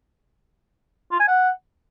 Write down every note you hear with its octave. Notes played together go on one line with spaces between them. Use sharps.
F4
G#5
F#5